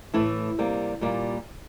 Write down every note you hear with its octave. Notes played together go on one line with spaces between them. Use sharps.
A2 E3 A3 E4
C3 G3 A#3
A#2 G3 A#3